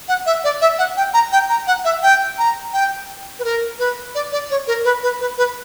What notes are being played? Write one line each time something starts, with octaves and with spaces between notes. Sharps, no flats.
F#5
E5
D5
E5
F#5
G5
A#5
G5
A#5
F#5
E5
G5
A#5
G5
B4
A#4
B4
D5
D5
C#5
A#4
B4
B4
B4
B4